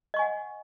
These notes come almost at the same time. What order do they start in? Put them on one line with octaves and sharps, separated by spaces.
D#5 C#6 G#5 F#5